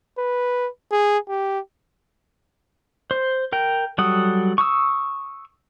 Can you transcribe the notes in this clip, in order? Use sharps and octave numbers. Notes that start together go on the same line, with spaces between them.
B4
G#4
G4
C5
A#4 G5
F#3 G3 A4 F#5 D#6
C#6 D#6 E6